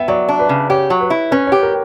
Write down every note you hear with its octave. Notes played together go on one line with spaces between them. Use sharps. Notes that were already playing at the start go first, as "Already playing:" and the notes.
Already playing: B3 E5 G5
F#3 D5
D4
B4
C#3
G4 C#5
F#3
B4
E4
C#4 B4
G4 C#5
A#4